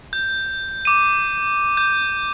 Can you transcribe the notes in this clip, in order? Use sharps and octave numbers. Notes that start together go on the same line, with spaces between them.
G6
D6 D#7
G6